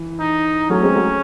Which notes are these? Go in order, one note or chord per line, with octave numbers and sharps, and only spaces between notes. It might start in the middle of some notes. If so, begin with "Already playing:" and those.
Already playing: E3
D#4
F#3 A3 C#4
G#3 C4
F#3 A3